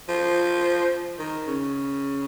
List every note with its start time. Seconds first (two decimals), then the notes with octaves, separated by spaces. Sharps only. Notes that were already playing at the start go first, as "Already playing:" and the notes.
0.09 F3
1.19 D#3
1.47 C#3